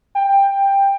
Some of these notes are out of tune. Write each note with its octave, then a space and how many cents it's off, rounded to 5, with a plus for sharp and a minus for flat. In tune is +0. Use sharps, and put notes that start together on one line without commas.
G5 +15